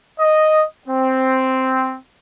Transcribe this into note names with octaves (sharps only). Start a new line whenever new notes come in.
D#5
C4